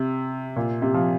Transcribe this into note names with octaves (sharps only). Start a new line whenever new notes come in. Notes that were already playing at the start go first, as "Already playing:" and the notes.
Already playing: C3
A#2
C3
F3